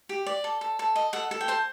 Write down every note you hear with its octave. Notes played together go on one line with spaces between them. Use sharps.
G4
D5
A4
A4
A4
D#5
A4 F#5
A4
G5
C5 A5